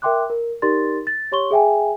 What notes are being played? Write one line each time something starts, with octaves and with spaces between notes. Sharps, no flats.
A#4 E5 G5 C6 D6 F#6
A#4
D#4 G4 A#4 D5 C6 A6
A6
G4 C#5 C6 C#6 G7
G#4 E5 G5 G#5